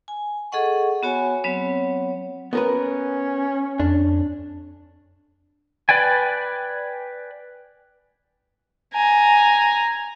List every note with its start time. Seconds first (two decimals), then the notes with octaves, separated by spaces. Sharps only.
0.08 G#5
0.52 G#4 A4 D#5 F#5 C#6
1.03 B3 F#4 C#5 G#5
1.44 F#3 B3 C4 C#5
2.53 B3 C#4 A#4 B4
3.79 F2 D4
5.89 B4 D5 G5 G#5
8.94 G#5 A#5